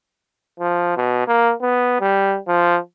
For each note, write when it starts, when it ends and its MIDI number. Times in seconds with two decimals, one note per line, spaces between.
0.60 0.93 53
0.97 1.24 47
1.27 1.52 58
1.62 2.00 59
2.01 2.38 55
2.47 2.78 53